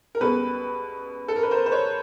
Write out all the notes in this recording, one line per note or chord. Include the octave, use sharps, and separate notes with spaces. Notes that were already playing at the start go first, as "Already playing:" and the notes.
A#4
C#2 B2 G3 A4 B4
A4
A#4
B4
A#4 C5
C5
B4 C#5